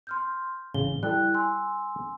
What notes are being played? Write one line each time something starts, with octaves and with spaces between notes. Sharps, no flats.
C6 F6 G6
A1 C#3 G7
G3 E4 A4 G5 F#6
G#5 C6 E6